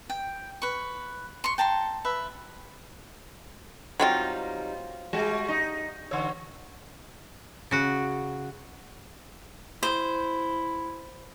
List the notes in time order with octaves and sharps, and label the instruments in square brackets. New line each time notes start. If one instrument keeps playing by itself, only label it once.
[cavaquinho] G5
B4 C#6
C6 C#6
G5 A5 A#5 C6
B4 E5 B5
[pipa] F#3 C4 F4 [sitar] G3 D#4
[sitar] G3 G#3 F#4
D#4
D3 C#5
[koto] C#3 F#4
[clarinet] E4 [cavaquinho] C5